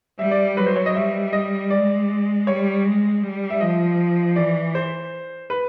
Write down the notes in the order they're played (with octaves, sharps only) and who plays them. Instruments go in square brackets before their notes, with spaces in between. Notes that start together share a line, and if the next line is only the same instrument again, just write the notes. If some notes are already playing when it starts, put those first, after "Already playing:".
[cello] G3 [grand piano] E5
[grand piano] D5
[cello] F#3 [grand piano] B4
[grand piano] C5
C#5
D#5
[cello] G3 [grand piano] E5
[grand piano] D#5
[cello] G#3 [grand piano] D5
[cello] G3 [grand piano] C#5
[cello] G#3
G3
[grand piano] E5
[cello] F3 [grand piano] D#5
[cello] E3 [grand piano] D5
[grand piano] C5
B4